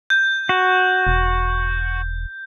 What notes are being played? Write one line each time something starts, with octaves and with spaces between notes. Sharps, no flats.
G6
F#4
E1